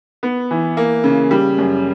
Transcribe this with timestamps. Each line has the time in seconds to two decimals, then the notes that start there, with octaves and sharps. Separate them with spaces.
0.23 B3
0.51 E3
0.77 A#3
1.04 C#3
1.31 G3
1.58 F#2